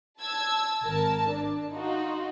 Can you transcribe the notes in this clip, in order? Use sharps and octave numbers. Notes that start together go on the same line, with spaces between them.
A5 E6 G#6
G#1 A#4 A5
D4
D#4 F4 F#4